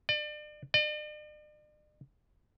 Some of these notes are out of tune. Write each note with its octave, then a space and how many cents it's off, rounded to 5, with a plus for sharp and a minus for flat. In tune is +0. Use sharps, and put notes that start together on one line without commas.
D5 +35
D5 +45